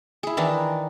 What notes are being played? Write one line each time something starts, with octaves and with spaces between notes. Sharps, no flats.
E4 G#4
D#3 E3 D4 D#4